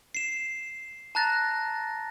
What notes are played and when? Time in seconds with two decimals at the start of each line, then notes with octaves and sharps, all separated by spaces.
0.15 C7 E7
1.15 A5 A#5 F#6 A6 A#6